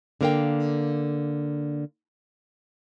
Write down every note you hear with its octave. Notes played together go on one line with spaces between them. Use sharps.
D3 A#3 A#4 F5 G5